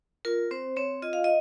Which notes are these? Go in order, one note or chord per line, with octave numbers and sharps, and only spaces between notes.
F4 A#4
C4 C5
C4 C#5
F4 D#5
F5
D#5